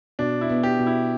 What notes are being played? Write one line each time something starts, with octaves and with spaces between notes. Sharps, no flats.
B2 D4
E4
B3
G4
B2
E4